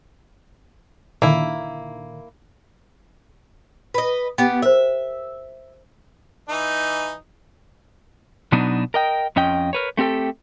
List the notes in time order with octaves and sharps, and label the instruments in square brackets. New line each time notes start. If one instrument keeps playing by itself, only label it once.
[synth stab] A#2 D3 D#3 [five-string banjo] A#3 E4
[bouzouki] B4 D#5
[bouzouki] B3 G4 [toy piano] G5
[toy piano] A#4 C5 [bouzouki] E5
[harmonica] E3 D#4
[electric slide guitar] B2 F#3 B3 D4 D#4
A#4 D#5 G5
F2 C#4 D#5 G5
A#4 B4 C#5
A3 C4 G4 A4 G5